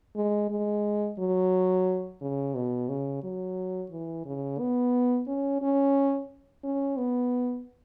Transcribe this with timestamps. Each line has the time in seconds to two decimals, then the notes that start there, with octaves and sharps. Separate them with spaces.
0.16 G#3
0.50 G#3
1.19 F#3
2.21 C#3
2.55 B2
2.89 C#3
3.23 F#3
3.91 E3
4.26 C#3
4.59 B3
5.28 C#4
5.62 C#4
6.64 C#4
6.97 B3